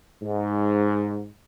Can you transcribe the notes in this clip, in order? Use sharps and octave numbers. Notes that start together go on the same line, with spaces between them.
G#2